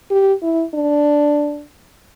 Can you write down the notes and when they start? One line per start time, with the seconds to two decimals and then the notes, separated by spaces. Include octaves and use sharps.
0.11 G4
0.42 E4
0.74 D4